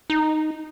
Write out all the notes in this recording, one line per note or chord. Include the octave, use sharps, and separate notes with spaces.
D#4